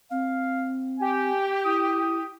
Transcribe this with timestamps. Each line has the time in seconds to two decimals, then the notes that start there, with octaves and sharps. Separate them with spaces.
0.11 C4 F5
0.99 G4 G#5
1.65 E4 D#6